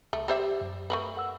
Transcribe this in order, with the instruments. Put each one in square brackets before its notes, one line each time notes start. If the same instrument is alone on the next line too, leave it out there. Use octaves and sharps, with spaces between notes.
[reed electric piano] C2 [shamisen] A3
[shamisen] G3 C5 E5 [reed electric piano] G4
[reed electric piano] F#2
[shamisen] A3 A#4 B4
[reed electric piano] F#5 E6